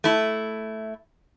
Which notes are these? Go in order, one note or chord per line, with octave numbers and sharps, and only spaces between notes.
A3 E4